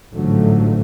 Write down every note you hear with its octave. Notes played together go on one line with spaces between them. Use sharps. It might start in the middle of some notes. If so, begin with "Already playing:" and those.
A1 G#2 D3 F3 F#3 A3